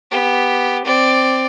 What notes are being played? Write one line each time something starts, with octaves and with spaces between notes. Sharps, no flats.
B3 G4
C4 D5